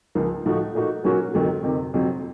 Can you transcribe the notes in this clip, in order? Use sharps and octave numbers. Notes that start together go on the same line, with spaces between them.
C#2 C#3 F3 A#3
A2 F3 A3 D#4 F#4
A#2 A3 D#4 F#4
A#2 F#3 A#3 C#4 F#4
F2 D#3 F#3 A3
F2 C3 D#3
F2 C3 F#3 C4